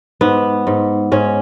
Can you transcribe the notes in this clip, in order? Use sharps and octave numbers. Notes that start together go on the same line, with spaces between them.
G#2 B3
G#2
G#2 C#4